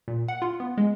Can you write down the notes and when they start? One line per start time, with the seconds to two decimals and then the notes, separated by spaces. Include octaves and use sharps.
0.08 A#2
0.28 F#5
0.42 F4
0.60 B3
0.78 G#3